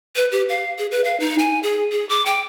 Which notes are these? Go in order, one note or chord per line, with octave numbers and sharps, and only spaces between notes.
B4
G4
F5
G#4
B4
F5
D#4
G#5
G#4
G#4
D6
G5